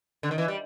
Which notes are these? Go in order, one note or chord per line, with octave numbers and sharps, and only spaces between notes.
D3
D#3
E3
G3